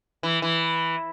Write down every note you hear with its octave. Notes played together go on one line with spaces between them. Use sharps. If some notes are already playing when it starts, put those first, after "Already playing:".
E3
E3